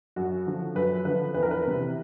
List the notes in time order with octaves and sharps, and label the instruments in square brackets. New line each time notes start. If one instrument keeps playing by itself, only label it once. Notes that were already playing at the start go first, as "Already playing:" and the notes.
[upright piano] F#2 F#4
D3 F3
F#2 B4
D3 F3 B4
E2 B4
A#4
B4
C3 E3